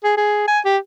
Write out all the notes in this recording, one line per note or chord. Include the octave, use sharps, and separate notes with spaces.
G#4
G#4
G#5
G4